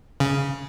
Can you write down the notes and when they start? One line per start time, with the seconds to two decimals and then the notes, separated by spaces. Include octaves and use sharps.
0.20 C#3